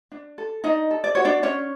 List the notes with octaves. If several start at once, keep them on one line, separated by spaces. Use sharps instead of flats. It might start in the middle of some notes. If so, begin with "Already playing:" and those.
D4
A4
D4 D#4 D#5
A4
D5
F#4 C#5
D4 D5
C#4 D4 C#5